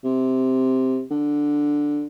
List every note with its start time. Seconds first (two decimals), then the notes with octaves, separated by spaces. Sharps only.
0.04 C3
1.10 D3